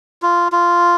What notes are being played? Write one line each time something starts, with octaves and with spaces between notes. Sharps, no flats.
F4
F4